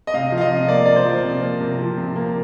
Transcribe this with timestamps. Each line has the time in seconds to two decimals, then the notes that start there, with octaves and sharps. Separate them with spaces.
0.07 D#5
0.14 C3 F5
0.32 F3
0.38 F5
0.41 D#5
0.50 C3
0.68 A#3 D5
0.85 C3 D5
0.96 C5
1.05 F3
1.24 C3
1.42 A#3
1.61 C3
1.79 F3
1.98 C3
2.16 A#3